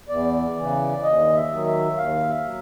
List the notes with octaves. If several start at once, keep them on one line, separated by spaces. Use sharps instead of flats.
E2 D5
C#3 E3
D#2 D#5
E5
D#3 F#3
E5
D#2 F5
E5
F#3